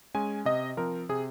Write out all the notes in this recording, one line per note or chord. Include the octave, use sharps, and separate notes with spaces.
G#3 C#4 G#5
C3 D#5
F3 C4 A#4
C3 G#4